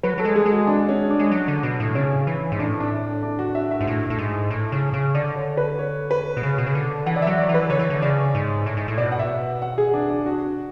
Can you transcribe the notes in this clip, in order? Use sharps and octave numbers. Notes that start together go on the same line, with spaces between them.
F#3 B4
F#3 A4
G#3
G#4
G#3
F#4
D4
C#4
D4
G#3
F#3
D3
B2
A2
C#3 C#4
E3
G#2
A2 D4
D4
D4
F#4
E5
E5
G#2
A2
A2
G#2
A2
C#3
C#3
D3 D5
C#5
B4
C#5
B4
B2
C#3
B2
C#3
D3
E3 F#5
D5
E5
F#3
D5
E3
B4
D3 C#5
E3
D3
C#3 D5
G#2
A2
G#2
A2
B2 D5
F#5
E5
F#5
G#4
D4
D4
F#4